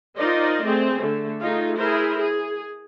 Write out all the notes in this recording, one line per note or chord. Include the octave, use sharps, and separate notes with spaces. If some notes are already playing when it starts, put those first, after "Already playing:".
D#4 F4 A#4 C5 D5 D#5
A3 C4 G#4
D3 A3
A3 D#4 F4 G#4
E4 G#4 A#4 C5
G#4